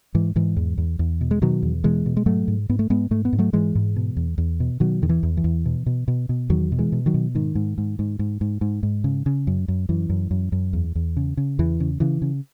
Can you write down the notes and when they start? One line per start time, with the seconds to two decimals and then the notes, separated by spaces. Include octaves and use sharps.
0.15 G#2 E3
0.36 G#2 E3
0.57 E2
0.78 E2
0.99 E2
1.21 B2
1.31 G#3
1.42 B2 D#3 F#3
1.62 E2
1.84 B2 E3 G#3
2.06 B2
2.17 G#3
2.26 G#2 F#3 A3
2.48 G#2
2.69 G#2 B3
2.79 A3
2.90 G#2 G#3 B3
3.11 G#2 A3
3.25 B3
3.33 G#2
3.39 F#3 A3
3.53 G#2 E3 G#3
3.75 G#2
3.96 B2
4.17 E2
4.38 E2
4.60 B2
4.80 B2 D#3 F#3
5.02 E2 D#3
5.09 E3
5.23 E2
5.37 E3
5.44 E2
5.65 B2
5.86 B2
6.08 B2
6.29 B2
6.50 E2 D#3 F#3
6.72 B2
6.78 E3 G#3
6.92 B2
7.06 D#3 F#3
7.14 B2
7.35 G#2 D#3
7.55 G#2
7.78 G#2
7.99 G#2
8.19 G#2
8.41 G#2
8.61 G#2
8.83 G#2
9.04 C#3
9.26 C#3
9.47 F#2
9.68 F#2
9.89 F#2 E3
10.09 F#2
10.31 F#2
10.52 F#2
10.73 E2
10.95 E2
11.17 C#3
11.37 C#3
11.59 E2 E3
11.80 C#3
12.00 C#3 E3
12.22 C#3